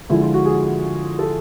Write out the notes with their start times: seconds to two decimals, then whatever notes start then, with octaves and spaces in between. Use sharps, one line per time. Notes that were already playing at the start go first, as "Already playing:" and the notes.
0.09 D3 F3 G#3 E4
0.22 F4
0.34 F#4
0.45 G#4
1.19 A4